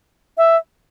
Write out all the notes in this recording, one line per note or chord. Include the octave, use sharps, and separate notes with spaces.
E5